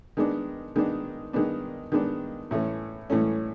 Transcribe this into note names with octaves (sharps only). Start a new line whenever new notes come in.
D#3 G#3 B3 D4
D#3 G#3 B3 D4
D#3 G#3 B3 D4
D#3 G#3 B3 D4
A2 E3 A3 C#4
A2 E3 A3 C#4